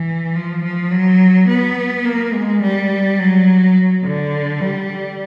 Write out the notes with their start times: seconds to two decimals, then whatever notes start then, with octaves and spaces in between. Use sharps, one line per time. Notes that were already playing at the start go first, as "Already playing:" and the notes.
Already playing: E3
0.35 F3
0.64 F3
0.91 F#3
1.48 B3
2.05 A#3
2.33 G#3
2.62 G3
3.19 F#3
4.04 D3
4.61 G3